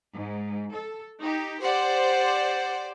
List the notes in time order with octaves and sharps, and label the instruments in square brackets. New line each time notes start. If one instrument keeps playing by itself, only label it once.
[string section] G#2
A4
D#4 G4
[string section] G4 C5 D5 [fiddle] F#5